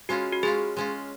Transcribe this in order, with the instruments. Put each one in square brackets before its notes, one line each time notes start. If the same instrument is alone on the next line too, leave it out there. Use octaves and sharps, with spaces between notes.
[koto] G#3 C#4 F4 [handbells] F#4
[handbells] F#4
[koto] G#3 C#4 F4 [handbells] G#4
[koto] G#3 C#4 F4